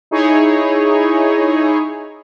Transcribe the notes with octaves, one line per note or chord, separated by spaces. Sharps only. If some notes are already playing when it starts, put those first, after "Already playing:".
D#4 E4 G#4 C#5